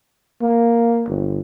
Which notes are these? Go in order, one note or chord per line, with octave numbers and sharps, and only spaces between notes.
A#3
G1